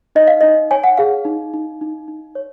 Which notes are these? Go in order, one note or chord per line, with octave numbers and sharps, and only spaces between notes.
D#4 D#5
F5
D#4 D#5
C#5 G#5
F#5
G#4 F5
D#4
D#4
D#4
D#4
C#5